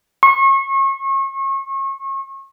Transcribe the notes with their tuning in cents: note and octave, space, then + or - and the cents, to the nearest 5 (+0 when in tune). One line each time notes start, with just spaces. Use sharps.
C#6 -35